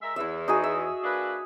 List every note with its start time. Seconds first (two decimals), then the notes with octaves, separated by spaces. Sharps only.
0.01 G#3 A#4 E5
0.16 E2 E4 E5
0.48 D#4 F#4 G#4
0.64 E5
1.03 A#3 D4 B4